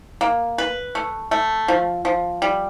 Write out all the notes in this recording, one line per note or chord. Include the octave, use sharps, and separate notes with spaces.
A#3
B4
A3
A3
F3
F3
G3